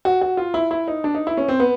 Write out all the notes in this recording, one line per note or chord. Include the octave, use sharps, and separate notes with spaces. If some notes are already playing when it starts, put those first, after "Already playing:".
F#4
F#4
F4
E4
E4
D#4
D4
D#4
E4
C#4
C4
B3